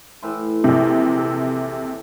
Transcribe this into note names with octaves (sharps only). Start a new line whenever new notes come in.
A2 E3 C5
A#1 C3
A4